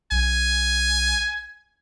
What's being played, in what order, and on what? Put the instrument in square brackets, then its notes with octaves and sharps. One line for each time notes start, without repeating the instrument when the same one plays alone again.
[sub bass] B1 [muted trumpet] G#5